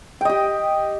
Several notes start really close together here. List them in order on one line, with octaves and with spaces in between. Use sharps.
G5 D#5 G4